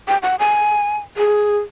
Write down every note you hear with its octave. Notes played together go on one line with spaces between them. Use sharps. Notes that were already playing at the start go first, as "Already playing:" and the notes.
G5
F#5
G#5
G#4